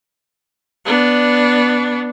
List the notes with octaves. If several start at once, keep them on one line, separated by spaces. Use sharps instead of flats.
B3 D4